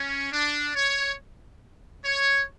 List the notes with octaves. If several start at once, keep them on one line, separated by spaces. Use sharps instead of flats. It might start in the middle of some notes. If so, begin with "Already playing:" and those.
Already playing: C#4
D4
C#5
C#5